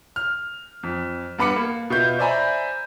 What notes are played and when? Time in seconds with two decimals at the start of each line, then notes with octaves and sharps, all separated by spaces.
0.16 F6
0.83 F2
1.38 G2 B3 B5 D6 C#7
1.56 A#3
1.90 B2 F4 E5 G6
2.19 C5 D5 E5 G#5 A#5 B5